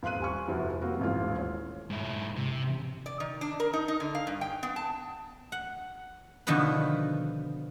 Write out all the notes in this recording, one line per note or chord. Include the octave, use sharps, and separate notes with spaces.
D#1 F5 C6 F#6 D#7
G3 G#5 C#6
F1 C3 F3 E4 F#4
G3 A#3 C4 F4 F#4
D#1 A1 G#2 F4
C#5
G#2 E4
C3
D5
D#3
D4
A#4
D#4
D#4
D3
F5
G2
G5
B3
A5
F#5
B2 D3 D#3 F3 B4